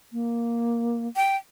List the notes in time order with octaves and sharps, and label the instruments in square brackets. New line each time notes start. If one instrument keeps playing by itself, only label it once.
[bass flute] A#3
[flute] G5